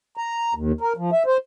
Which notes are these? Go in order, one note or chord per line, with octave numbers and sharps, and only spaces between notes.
A#5
D#2
A#4
F3
E5
C5